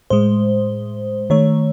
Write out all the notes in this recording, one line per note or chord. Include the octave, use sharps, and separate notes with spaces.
A2 G#3 C5
D#3 A3 C#5